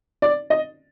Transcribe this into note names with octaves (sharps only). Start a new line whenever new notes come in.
D5
D#5